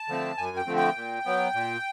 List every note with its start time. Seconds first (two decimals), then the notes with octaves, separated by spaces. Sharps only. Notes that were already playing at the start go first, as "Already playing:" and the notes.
Already playing: A5
0.08 D3 F3 A3 C4
0.38 F#2 G#5
0.57 G5
0.67 D3 F3 A3 C4
0.76 G5
0.96 A#2
1.25 F#3 B3
1.54 A#2